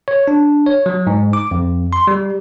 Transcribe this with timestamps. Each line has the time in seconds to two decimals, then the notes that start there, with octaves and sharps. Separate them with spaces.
0.08 C#5
0.28 D4
0.66 C#5
0.86 F#3
1.07 G#2
1.33 D6
1.51 F2
1.93 C6
2.07 G3